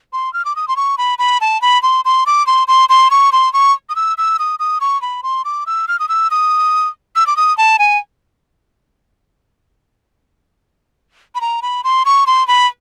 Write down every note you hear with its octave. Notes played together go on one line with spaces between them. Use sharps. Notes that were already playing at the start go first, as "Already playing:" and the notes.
C6
F6
D6
D#6
C6
C#6
B5
B5
A5
B5
C6
C6
D6
C6
C6
C6
C#6
C6
C#6
D#6
E6
E6
D#6
D#6
C#6
B5
C6
D6
E6
F6
D#6
E6
D#6
E6
D6
D#6
A5
G#5
B5
A#5
B5
C6
C#6
C6
B5